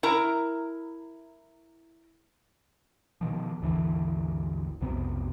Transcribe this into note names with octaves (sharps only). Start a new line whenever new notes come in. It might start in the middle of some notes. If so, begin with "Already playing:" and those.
E4 A#4 A#5
B2 D#3 F3
G#1 D#2 D3 E3
B1 F2 C3 B3